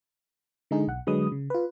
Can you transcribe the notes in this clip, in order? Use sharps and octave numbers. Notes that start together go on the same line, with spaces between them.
D3 G#3 D#4 G#4
B1 F#5
D3 F#3 G#3 B4 D#6
C#3
F4 B4